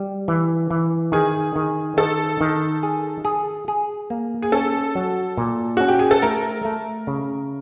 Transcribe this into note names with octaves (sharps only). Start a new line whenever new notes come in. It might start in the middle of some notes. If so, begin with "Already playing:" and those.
Already playing: G3
E3
E3
D#3 G#4
D#3
D#3 A4
D#3
G#4
G#4
G#4
A#3
G#4
C#4 A4
F#3
A#2
C#4 F#4
G4
G#4
A4
A3 A#4
A3
C#3